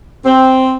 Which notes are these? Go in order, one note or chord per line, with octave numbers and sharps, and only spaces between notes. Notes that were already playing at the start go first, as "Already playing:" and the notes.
C4